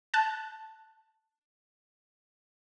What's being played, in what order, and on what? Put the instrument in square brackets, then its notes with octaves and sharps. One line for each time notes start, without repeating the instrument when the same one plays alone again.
[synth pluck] A5 F#6